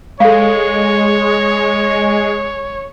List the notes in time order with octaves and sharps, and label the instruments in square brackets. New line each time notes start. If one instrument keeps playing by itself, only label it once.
[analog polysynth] G#3 [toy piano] A4 F5 [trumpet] C#5